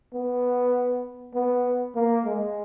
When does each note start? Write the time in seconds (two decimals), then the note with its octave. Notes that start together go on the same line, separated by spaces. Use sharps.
0.13 B3
1.34 B3
1.95 A#3
2.25 G#3